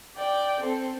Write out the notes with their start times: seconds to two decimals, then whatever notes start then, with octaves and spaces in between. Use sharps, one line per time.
0.16 D5 G5
0.61 C4 A4